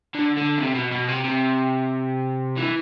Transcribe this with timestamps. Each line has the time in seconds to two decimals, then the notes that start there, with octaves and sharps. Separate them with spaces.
0.15 D3
0.37 D3
0.59 C3
0.75 B2
0.92 B2
1.08 C3
1.25 C3
2.58 E3